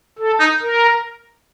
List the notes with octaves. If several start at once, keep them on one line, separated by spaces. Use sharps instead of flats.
A4
D#4
A#4